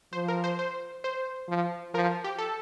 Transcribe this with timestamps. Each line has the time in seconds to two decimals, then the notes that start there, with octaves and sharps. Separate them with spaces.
0.13 F3 C5
0.28 A#4
0.44 C5
0.59 C5
1.04 C5
1.48 F3
1.94 F3 A#4
2.24 G4
2.38 A4